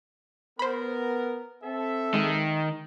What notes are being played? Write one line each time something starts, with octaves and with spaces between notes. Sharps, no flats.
B3 A#4 C5 B5
C4 A4 E5
D#3 G#3